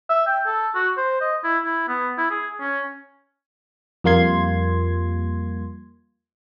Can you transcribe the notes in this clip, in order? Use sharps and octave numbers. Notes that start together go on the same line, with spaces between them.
E5
G5
A4
F#4
C5
D#5
E4
E4
B3
E4
G#4
C#4
F2 G3 A#3 F4 C6 G#6